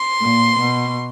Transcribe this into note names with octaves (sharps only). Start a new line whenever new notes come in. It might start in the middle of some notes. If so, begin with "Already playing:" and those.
Already playing: C6
A#2
B2